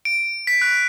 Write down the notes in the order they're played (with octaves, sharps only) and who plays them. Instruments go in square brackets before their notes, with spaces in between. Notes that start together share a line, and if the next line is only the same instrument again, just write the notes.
[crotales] D7
B6
F#6